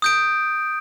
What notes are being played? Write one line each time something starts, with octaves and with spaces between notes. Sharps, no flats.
D#6 G6 D7